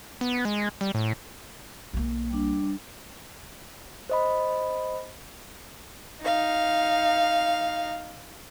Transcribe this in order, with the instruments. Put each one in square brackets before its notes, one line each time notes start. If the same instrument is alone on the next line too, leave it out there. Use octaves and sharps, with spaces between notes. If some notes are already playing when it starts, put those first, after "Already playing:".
[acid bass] B3
G#3
G3
A2
[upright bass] B1 A#3
[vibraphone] G3 D4
[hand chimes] C5 D#5 B5
[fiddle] D#4 F5